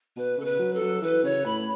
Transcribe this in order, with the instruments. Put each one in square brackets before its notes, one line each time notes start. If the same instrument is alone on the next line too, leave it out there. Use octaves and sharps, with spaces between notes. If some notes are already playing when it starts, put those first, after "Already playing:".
[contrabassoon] B2 [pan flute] B4
[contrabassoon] C#3 [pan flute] A4
[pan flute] B4
[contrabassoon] F#3
[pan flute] A4
[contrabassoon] F#3
[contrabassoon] E3 [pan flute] B4
[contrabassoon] C#3 [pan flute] C#5
[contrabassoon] A2 [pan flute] B5